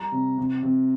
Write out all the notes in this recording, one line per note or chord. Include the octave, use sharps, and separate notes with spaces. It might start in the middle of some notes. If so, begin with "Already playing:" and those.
Already playing: G3 A#5
C3
C3
C3